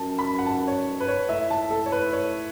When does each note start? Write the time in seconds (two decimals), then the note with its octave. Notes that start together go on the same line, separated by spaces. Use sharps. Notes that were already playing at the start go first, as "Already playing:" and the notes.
Already playing: F#2 A5
0.19 B5
0.39 F#5
0.46 A5
0.67 C#5
1.00 B4
1.08 C#5
1.29 A2 E5
1.51 A5
1.71 A4
1.86 C#5
1.92 B4
2.13 C#5